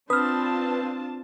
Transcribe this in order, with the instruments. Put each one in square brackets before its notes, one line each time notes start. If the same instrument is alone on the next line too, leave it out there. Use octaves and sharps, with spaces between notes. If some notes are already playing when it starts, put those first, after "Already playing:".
[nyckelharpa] C4 [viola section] D4 F4 A5 [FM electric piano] B4 [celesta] D#6 F6